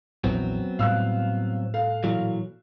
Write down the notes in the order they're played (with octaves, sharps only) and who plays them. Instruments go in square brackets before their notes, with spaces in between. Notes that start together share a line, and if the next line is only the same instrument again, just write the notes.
[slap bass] A#1 E2 [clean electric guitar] F#3 B3 C4
[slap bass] A2 C3 G3 [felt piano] F5 E6 F#6
[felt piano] A4 F5
[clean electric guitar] A#2 E3 F#3